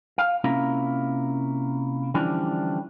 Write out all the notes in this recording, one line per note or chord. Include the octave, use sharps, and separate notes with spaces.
F5
C3 A#3 C#4 E4 F4 A#4
D3 E3 F3 G3 C#4 D4